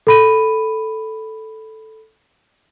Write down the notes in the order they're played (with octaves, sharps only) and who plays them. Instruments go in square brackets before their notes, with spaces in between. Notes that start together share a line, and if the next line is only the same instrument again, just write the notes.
[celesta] A4 B5 D#7